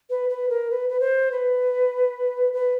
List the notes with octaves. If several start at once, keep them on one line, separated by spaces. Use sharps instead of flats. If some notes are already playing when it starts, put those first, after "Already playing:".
B4
B4
A#4
B4
B4
C5
B4
B4